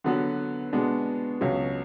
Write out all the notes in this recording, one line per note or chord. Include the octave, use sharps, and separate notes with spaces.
D3 F#3 B3 F#4 B4
B2 G#3 B3 D4 F#4
C#2 B2 F#3 C#4